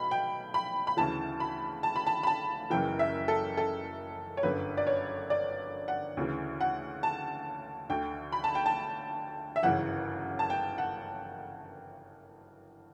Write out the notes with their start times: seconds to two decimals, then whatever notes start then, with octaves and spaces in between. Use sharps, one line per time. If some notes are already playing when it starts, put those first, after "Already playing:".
Already playing: B1 B2 B5
0.11 G5
0.54 B5
0.87 B5
0.97 D2 C#3 E3 A5
1.40 B5
1.83 A5
1.96 B5
2.07 A5
2.23 B5
2.27 A5
2.70 F#1 F#2 C#3 E3 G5
2.99 E5
3.28 A4
3.57 A4
4.37 C#5
4.43 G1 F#2 D3 B4
4.77 D5
4.87 C#5
5.30 D5
5.88 F#5
6.17 D2 C#3 E3
6.61 F#5
7.03 A5
7.90 D2 D3 G5
8.32 B5
8.44 A5
8.55 G5
8.66 A5
9.56 E5
9.63 G1 F#2 C#3 E3 F#5
10.39 A5
10.50 G5
10.78 F#5